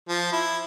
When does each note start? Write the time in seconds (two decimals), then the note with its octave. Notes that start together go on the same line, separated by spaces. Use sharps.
0.08 F3
0.32 E4